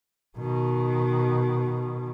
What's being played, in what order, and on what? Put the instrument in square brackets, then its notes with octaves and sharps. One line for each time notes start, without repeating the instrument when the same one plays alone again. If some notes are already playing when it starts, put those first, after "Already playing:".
[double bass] B2 D#3